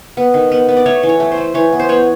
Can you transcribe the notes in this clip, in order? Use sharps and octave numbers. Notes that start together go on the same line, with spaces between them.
B3
D#3
B3
B3
D5
A3 C#5
E3
C#5
A3
C5
A3
E3 C#5
B3
C5
B3 C#5